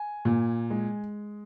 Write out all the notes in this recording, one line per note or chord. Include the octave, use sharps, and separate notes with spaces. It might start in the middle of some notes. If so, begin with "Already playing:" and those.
Already playing: G#5
A#2
G#3